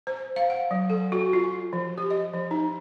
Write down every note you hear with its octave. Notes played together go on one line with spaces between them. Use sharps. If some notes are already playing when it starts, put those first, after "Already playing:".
C5
F5
F#5
F#3
A4
F#4
F4
F3
G4
D#5
F3
D#4